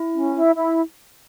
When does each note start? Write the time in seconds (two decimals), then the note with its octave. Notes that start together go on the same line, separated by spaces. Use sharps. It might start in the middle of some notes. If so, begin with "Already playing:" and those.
Already playing: E4
0.14 C#4
0.34 E4
0.54 E4